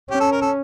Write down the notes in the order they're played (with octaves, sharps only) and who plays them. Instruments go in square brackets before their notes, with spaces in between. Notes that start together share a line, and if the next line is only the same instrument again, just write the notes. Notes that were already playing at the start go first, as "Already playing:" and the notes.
[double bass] C#4 [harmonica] G4
[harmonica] A4
A#4
A4